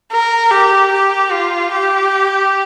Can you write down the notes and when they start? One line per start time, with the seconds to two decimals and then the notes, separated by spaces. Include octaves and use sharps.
0.12 A#4
0.51 G4
0.91 G4
1.32 F4
1.72 G4